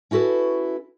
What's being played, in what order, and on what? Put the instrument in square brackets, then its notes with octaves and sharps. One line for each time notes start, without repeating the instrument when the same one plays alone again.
[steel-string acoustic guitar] C#4 E4 F#4 A4 B4